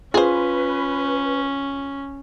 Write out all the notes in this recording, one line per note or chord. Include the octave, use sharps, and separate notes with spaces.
C#4 F4 G#4 B4 C5